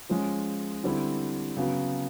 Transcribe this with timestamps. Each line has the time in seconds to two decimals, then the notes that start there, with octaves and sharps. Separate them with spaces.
0.09 F3 G#3 C#4
0.84 D3 G3 C4 E4
1.57 C#3 F#3 B3